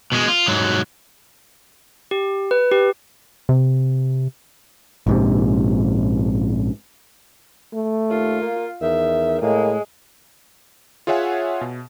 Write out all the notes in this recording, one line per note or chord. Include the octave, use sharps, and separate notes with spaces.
B2 G#3
F4
G#2 F#3
G4
B4
G4
C3
A#1 G#2 C3
A3
D#2 F4
A#3
E2 D#3 E5
A2 G#3 A#3
F4 G#4 C#5 E5 F#5 G#5
B2